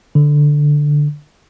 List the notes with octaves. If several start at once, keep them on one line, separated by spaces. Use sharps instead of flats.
D3